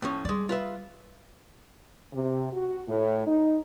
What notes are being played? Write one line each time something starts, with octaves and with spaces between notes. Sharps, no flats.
A2 F3 C#4
G3 G#3 D5
F4 B4 E5
C3
F#4
A2
D#4